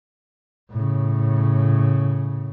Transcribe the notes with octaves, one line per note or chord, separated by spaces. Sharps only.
A2 C#3